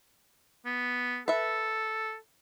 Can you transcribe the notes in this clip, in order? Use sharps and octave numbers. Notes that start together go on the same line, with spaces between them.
B3
A4 B4 E5